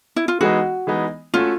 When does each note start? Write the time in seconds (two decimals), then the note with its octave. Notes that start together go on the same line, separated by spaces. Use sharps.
0.16 E4
0.28 F4
0.40 E3 G#3 B3 D#4 F#4
0.87 E3 G#3 B3 D#4
1.34 A3 C#4 F4 F#4 A4